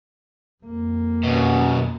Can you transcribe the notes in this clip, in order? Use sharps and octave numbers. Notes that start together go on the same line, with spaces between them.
F2 A#3
F#2 B2